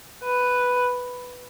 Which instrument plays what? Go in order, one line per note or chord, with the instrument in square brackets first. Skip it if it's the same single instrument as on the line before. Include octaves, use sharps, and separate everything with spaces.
[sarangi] B4